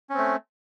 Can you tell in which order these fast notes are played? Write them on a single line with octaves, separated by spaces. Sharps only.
C#4 C4 A3